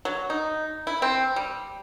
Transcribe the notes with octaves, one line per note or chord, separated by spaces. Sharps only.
F#3
D#4
E4
C4
G3